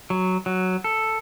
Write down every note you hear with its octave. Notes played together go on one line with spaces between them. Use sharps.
F#3
F#3
A4